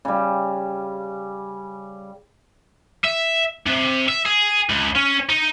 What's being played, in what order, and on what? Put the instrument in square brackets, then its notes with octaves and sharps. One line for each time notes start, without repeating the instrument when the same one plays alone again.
[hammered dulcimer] C#3 G3
[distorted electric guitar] E5
C3
E5
G#4
C#2
C#4
D#4